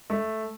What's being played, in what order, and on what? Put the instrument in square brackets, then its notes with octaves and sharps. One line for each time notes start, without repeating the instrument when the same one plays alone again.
[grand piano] A3